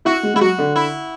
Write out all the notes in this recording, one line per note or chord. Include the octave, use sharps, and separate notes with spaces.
E4 F#4
G#3
G#3 E4
F#3 F#4
D3
E4